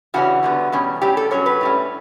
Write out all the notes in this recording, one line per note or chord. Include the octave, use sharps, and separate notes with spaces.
C#3 E3 G3 C#4 F#4
E2 D3 G3 B3
E2 B2 G3 C#4
A2 G3 C#4 G4
A4
B2 F#3 C#4 C#5
B4
A2 G3 C#4